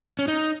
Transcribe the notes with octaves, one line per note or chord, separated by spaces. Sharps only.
C#4
D#4